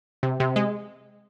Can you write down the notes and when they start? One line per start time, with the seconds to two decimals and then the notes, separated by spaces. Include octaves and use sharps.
0.23 C3
0.40 C3
0.56 G#3